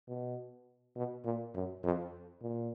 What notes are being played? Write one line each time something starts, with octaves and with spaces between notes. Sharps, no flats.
B2
B2
A#2
F#2
F2
A#2